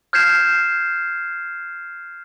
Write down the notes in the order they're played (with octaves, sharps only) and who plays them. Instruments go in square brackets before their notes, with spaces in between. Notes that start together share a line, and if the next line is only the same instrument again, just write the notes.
[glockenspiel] F6 G6 G#6 C7 E7